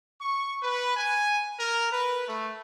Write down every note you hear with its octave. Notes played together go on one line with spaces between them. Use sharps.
C#6
B4
G#5
A#4
B4
A3